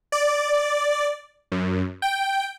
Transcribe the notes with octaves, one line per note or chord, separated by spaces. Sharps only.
D5
F#2
G5